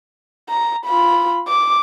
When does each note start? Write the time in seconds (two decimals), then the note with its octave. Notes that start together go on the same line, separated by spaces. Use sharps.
0.49 A#5
0.85 F4 B5
1.48 D6